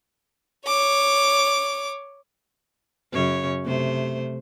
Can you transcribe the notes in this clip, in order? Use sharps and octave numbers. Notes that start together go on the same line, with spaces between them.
C#5 D6
F#2 C#3 C#5
C3 A3 C5